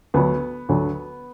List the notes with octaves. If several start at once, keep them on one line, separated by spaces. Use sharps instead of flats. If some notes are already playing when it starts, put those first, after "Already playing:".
D2 D3 F#3 B3
D2 D3 F#3